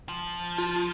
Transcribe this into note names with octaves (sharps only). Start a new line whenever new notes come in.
F3
F4